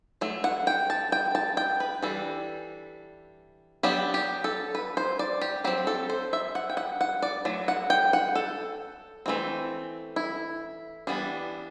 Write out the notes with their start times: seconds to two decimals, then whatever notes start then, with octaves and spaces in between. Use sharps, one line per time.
0.21 F#3 A3
0.44 F#5
0.67 G5
0.90 A5
1.12 G5
1.35 A5
1.57 G5
1.80 B4
2.03 E3 G3 D4 A4
3.83 F#3 B3 D4 G4
4.14 G4
4.44 A4
4.75 B4
4.97 C5
5.19 D5
5.41 G4
5.64 F#3 C4 G4
5.87 A4
6.10 C5
6.33 E5
6.55 F#5
6.70 G5
6.77 F#5
7.01 F#5
7.22 D5
7.45 F#3 A3
7.68 F#5
7.90 G5
8.13 F#5
8.35 A4
9.26 E3 A3 C4
10.16 E4
11.07 E3 G3 B3 D4